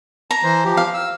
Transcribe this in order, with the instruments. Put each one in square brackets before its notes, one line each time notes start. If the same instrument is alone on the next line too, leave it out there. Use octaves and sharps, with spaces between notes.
[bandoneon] A5 [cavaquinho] A#5
[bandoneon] E3 C5
F3 G4
[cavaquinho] F5
[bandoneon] E6